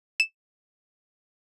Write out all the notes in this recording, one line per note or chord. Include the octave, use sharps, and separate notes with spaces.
E7